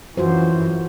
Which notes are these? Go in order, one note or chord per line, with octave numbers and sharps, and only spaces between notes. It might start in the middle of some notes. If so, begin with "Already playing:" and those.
F#2 E3 F4 F#4 C5